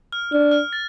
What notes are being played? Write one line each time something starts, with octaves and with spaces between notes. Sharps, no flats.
F6
D4 F6
F6
A6